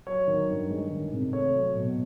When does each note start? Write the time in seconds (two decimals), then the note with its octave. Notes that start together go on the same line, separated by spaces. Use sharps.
0.07 F#3 C#5
0.27 D#3
0.50 G2
0.70 G#3
0.91 D#3
1.13 C3
1.33 A3 C#5
1.55 F#3
1.76 B2